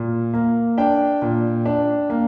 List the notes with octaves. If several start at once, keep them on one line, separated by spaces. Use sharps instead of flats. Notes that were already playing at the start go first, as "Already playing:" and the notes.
Already playing: A#2
A#3
D4 G5
A#2
D4
A#3